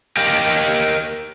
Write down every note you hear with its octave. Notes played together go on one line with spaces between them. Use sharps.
G4 A#4 D#5 F5 G5